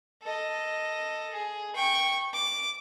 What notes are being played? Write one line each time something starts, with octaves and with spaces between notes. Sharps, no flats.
A4 D#5
G#4
G5 C#6
D6